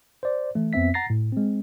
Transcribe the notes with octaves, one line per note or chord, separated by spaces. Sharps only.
C5 D5
E3 A3
F2 B3 C4 E5 B6
F#5 A#5 A6 A#6 C7
A2
G#3 C4